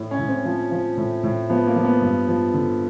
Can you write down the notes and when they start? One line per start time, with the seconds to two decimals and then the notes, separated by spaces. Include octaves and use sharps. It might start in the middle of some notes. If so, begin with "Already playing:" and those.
Already playing: A2
0.11 C#4
0.19 A2
0.28 C4
0.45 F3
0.71 F3
0.97 A2
1.23 A2
1.50 F3 B3
1.67 A#3
1.76 F3
1.85 B3
2.02 G2
2.28 F3
2.54 D3